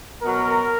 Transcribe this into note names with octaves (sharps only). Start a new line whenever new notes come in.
B2 F#3 B3 A#4